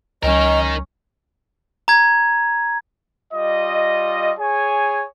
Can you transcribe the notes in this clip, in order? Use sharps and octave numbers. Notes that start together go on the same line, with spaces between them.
C#2 F#3 C#4 D#4 A#4 D#5
A#5 G#6
G3 F4 D#5
G#4 C#5 G#5